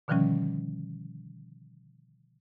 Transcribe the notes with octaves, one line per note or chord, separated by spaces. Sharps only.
B2 D3 D#3 F3 G3 C#4